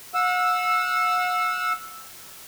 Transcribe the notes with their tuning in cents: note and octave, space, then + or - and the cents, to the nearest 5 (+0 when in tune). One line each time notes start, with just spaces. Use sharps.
F#5 -40 E6 +0